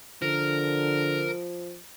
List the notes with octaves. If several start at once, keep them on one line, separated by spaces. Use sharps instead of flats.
D3 F3 A#4